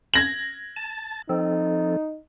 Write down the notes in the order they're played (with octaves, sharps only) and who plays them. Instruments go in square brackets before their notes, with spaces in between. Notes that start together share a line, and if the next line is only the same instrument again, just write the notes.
[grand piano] G#6 A#6 F#7
[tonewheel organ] A5 A6
[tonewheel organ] F3 C4 A4 [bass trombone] D#4